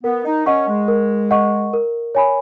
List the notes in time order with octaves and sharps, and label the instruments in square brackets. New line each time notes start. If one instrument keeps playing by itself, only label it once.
[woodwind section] B3 [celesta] A#4
[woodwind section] D#4
[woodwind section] C#4 [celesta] D#5 F#5 C#6
[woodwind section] G#3
[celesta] A#4
D#5 F#5 C#6
A#4
C#5 G#5 B5